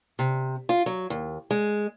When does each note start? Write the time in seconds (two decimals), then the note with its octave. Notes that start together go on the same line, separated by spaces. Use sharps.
0.19 C3
0.69 F4
0.86 F#3
1.10 D#2
1.51 G#3